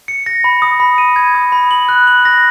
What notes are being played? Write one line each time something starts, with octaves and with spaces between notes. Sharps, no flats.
C#7
A#6
B5
D#6
B5
D#7
G#6
D#6
B5
F#7
F#6
F#7
A#6